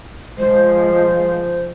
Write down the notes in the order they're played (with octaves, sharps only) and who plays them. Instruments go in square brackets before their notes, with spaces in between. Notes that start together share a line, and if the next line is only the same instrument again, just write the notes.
[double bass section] F3 G#3 [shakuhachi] C5